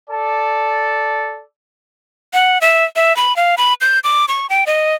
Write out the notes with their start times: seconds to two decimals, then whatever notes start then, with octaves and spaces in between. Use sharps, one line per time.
0.10 A4 D5 A5
2.33 F#5
2.61 E5
2.96 E5
3.17 B5
3.36 F5
3.58 B5
3.81 G6
4.04 D6
4.28 C#6
4.50 G5
4.67 D#5